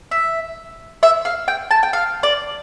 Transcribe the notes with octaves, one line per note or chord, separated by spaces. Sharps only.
E5
E5
F5
G5
A5
G5
F5
D5